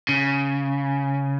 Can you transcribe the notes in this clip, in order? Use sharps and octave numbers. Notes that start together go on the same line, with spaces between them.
C#3